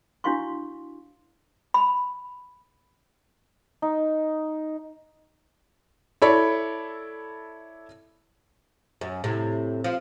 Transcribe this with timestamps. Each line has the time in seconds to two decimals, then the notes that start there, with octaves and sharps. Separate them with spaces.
0.24 D4 E4 F#4 F5 C6 C#6
1.74 B5
3.82 D#4
6.22 E4 A4 C#5 D5 B5
9.01 F#2
9.24 A2 C3
9.84 F3